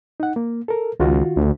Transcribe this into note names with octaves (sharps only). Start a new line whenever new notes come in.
D#4 F#5
A#3
A4 A#4
C#2 D#3 F4 F#4
D2